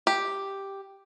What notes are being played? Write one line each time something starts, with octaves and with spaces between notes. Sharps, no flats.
G4